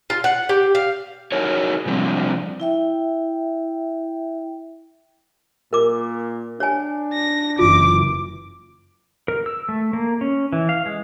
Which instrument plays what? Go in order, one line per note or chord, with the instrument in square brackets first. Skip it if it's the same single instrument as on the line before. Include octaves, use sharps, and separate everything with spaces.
[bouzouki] F4
F#5
G4
F5
[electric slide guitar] D#4 F#4 G#4 A#4 C#5
C3 F3 G3 C4 D4
[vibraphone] E4 E5 G5
[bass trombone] A#2 [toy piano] A#4 D6
[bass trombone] D4 [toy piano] C#5 G#5
[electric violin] A#6
[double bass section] F#1 F#2 E3 [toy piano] F4 [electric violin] D6
[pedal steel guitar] A#4
E6
A3
A#3
C#4
E3
F5
G#3